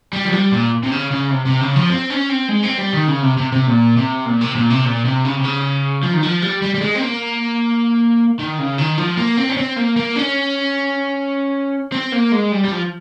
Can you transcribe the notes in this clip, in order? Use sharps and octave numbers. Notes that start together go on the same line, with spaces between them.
G3
F3
G3
A#2
C3
C#3
C#3
C3
C3
C#3
F3
C4
C#4
C4
G#3
C4
G3
D#3
C#3
C3
C3
C3
A#2
C3
A#2
C3
A#2
C3
A#2
C3
C#3
C3
C#3
F3
D#3
F3
G3
G3
G3
G#3
C4
A#3
D#3
C#3
D#3
F3
A#3
C4
C#4
C4
A#3
A#3
C#4
C4
A#3
G#3
G3
G3
F3